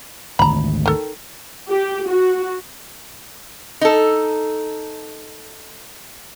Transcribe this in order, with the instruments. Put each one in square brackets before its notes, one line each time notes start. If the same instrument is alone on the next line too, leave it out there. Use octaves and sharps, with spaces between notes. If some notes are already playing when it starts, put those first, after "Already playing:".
[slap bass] G#1 D2 [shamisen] A#5 B5
[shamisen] D#3 A4
[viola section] G4
F#4
[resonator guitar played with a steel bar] D#4 A4